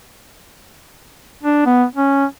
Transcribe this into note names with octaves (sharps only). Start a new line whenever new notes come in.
D4
B3
C#4